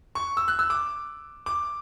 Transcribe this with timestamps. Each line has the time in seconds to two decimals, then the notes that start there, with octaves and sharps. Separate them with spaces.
0.15 C#6
0.37 E6
0.48 F#6
0.59 E6
0.70 D6
1.46 D6